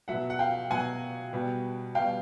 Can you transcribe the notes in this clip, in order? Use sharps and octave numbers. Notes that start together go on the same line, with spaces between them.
B2 F#3 E5 F#5
F#5
F5 G5
B2 F#3 F#5 G#5
B2 G3
B2 G3 F5 G5